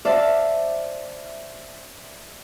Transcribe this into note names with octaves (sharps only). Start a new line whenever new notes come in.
C5 D5 E5 F5 A5 D6